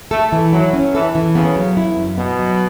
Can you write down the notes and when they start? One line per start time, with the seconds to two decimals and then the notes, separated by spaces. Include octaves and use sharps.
0.11 A3 A4
0.32 E3
0.53 F#3 E4
0.73 C#4
0.94 E3 A4
1.15 E3
1.35 C#3 B3
1.56 F#3
1.77 E4
1.97 F#2
2.18 B2 B3
2.39 F#3